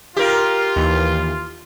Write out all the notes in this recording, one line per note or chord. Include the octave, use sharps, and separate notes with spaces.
F4 G4 A#4
D#2 E3